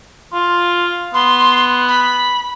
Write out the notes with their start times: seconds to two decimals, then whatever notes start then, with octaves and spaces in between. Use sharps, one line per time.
0.33 F4
1.14 B3 C6
1.88 B5